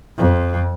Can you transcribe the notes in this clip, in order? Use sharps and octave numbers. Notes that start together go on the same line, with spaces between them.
F2